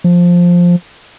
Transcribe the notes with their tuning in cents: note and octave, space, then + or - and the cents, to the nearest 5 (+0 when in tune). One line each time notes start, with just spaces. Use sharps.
F3 +5